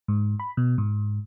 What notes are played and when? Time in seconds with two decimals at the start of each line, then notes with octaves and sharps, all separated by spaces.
0.08 G#2
0.40 B5
0.57 B2
0.78 G#2